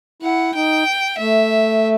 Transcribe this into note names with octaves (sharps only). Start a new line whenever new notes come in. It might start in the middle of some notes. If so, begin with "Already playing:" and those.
E4 F#5
D#4 G5
A3 E5